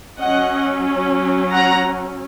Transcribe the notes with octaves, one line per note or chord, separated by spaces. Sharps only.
F#3 C#4 D#5 F#5
F#5 A#5